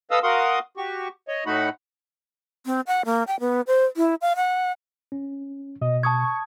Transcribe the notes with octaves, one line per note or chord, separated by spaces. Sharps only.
A4 B4 D#5 F5 D#6 E6
F#4 A#4 F5 F#5 C6 D#6
F#4 G4 C#6
C#5 D#5
A2 A3 D#4 F#4 F#5 B5
C4
F#5
A#3
G5
B3
C5
E4
F5
F#5
C#4
B2 D#5
A5 C#6 D#6 G#6